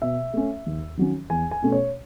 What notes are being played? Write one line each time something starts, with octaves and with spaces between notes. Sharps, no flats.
B2 E5
A3 C#4
D#2
D#3 F#3 C#4
E2 G#5
G#5
B2 A3 C#4
C#5